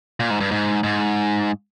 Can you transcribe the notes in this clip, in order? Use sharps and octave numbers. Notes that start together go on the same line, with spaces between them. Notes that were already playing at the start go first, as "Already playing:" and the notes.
A#2
G#2
G2
G#2
G#2